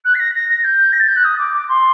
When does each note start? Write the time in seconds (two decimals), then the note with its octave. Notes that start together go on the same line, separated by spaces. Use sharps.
0.04 F#6
0.14 C7
0.19 A#6
0.34 A#6
0.48 A#6
0.64 G6
0.92 A#6
0.99 A6
1.08 G6
1.15 F#6
1.24 D#6
1.38 D6
1.53 D6
1.68 C6